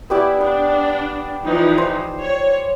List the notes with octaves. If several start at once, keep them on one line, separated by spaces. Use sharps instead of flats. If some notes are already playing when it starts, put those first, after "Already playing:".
B3 E4 G4 D5
B3 D4
E3 F3 D#4
C5
C#5